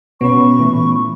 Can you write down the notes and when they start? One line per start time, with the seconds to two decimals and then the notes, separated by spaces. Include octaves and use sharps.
0.21 B2 B3 C#4 B5 C#6
0.59 A#2 E3 A3